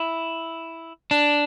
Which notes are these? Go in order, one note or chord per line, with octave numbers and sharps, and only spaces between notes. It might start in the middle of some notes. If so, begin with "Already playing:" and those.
Already playing: E4
D4